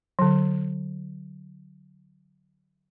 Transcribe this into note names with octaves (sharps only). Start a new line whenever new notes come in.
D3 F#3